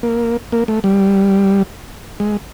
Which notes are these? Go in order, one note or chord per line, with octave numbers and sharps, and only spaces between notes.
A#3
A#3
A3
G3
G#3